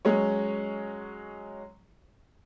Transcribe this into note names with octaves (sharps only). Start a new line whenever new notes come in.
F#3 G#3 C#4 C#5